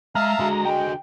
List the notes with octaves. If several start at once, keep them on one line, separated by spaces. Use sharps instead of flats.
G#3 E5 F5 A5 A#5 F6
D3 G#3 F#4
G#3 G5